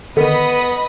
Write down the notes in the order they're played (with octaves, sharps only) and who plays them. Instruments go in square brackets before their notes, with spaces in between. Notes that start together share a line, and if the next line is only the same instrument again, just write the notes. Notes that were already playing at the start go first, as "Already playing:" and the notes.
[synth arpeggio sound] D3 D#3 [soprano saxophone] B3 [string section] B4 D#5 B5